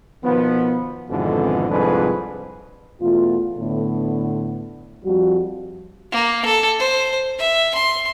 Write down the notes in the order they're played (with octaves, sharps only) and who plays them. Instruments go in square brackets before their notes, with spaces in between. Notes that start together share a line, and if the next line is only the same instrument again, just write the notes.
[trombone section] B2 D#3 F3 B3
G#1 F2 G#2 B2 D3 E3
C2 F2 G#2 D4 G#4 B4
[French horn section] E2 B2 A3 F4
A2 D3 B3
F2 F3 G3 F#4
[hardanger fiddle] A#3
A4
C5
E5
C6